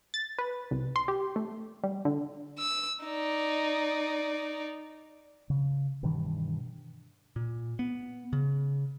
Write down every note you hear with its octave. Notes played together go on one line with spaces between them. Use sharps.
A6
B4
C2
C6
G4
A3
G3
D3
E6
D#4 D5
C#3
G2 B2 D#3 E3
A#2
B3
C#3